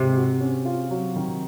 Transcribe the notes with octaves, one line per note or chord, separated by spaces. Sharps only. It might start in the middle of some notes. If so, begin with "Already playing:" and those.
Already playing: G#2 C3 C4
F#4
C#4
F4
F#3
D#3